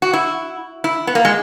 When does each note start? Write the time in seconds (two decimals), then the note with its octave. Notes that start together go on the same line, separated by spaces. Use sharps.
0.02 F#4
0.13 E4
0.84 E4
1.07 B3
1.15 A#3
1.25 G#3